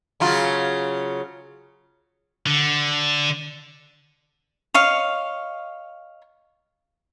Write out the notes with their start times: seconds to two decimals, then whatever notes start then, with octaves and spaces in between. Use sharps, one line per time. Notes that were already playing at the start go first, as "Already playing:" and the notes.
0.20 C#3 F#3 F4
2.46 D3
4.74 C#5 D#5 F5